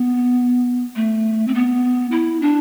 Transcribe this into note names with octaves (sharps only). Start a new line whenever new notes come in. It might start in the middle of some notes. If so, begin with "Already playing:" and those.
Already playing: B3
A3
C4
B3
E4
D4